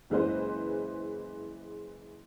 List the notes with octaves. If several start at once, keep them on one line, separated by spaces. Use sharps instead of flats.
F#1 E3 G#3 B4 C5